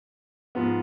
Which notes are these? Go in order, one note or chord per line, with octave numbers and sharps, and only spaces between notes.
G#2 F3 B3